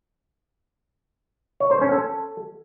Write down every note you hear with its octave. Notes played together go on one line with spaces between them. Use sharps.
C#5
C5
C#4
A4